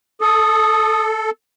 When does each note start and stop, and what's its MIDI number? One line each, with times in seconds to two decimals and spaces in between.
0.21 1.31 69
0.21 1.04 87